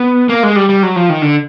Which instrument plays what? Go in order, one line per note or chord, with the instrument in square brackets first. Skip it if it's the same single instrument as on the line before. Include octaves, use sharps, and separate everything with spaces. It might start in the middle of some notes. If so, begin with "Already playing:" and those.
Already playing: [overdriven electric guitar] B3
A#3
G#3
G3
G3
F#3
F3
D#3
D3